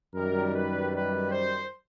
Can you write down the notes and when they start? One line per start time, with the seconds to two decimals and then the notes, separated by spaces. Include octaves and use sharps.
0.15 F#2 D#3 G3 A#4
0.54 B4
0.93 B4
1.31 C5